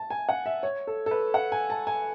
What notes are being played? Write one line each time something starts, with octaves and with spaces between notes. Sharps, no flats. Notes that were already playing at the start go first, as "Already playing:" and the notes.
Already playing: A5
G#5
F#5
E5
C#5
A4
A4
B4
F#5
G#5
A5
G#5